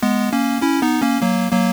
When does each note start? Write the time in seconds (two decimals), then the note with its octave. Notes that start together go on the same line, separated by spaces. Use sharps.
0.02 G#3 B3
0.33 A#3 C#4
0.62 C#4 E4
0.82 B3 D#4
1.02 A#3 C#4
1.22 F#3 A#3
1.52 F#3 A#3